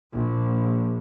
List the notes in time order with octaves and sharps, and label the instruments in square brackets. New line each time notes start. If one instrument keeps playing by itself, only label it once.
[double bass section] A#1